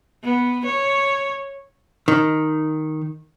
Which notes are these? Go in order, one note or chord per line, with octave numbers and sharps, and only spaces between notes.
B3
C#5
D#3